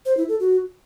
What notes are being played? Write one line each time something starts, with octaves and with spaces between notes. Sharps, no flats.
C5
E4
A4
F#4